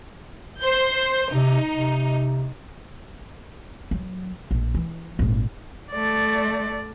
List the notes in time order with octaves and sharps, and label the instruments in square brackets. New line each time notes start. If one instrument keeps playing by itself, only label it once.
[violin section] C5 G6
[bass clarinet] C3 [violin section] D#4
[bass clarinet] C3
[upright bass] F#3
A#1
E3
G#1 A#2
[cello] A3 D5